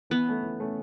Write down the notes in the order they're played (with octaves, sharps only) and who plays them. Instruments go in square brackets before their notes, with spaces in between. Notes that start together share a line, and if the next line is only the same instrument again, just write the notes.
[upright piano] E3 [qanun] B3
[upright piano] A3 C#4
E3
A3 C#4